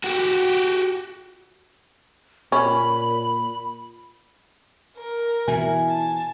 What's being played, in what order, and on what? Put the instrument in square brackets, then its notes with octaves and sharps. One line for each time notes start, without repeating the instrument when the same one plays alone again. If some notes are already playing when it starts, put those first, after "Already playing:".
[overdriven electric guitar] F#4 G4
[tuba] A#2 [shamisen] C#4 [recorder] B5
[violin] A#4
[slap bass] B2 E3 [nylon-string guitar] E4 [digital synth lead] G#5
[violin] A5